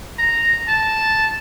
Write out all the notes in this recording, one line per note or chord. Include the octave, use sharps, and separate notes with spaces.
A#5
A5